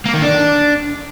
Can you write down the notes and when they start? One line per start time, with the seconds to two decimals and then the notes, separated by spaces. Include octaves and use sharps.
0.06 A#3
0.14 D#3
0.22 D4